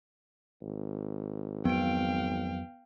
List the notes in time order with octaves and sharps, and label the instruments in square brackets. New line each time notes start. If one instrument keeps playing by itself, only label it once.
[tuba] G#1
[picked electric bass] F2 F#3 C4 [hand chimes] B3 D7 [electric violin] F5 G5